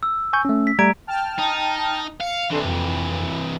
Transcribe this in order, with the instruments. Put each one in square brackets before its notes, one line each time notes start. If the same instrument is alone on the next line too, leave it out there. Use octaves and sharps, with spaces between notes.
[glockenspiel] E6
[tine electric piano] G#5 C#6 G6
A3 C#4
[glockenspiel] B6
[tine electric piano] G3 A3 G#6 [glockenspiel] A#5 D7
[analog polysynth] G5 A5 F6
[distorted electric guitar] D#4
[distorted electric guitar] F5 [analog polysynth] C#7
[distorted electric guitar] C3 E3 [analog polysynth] D4 A4 C6
[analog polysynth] F2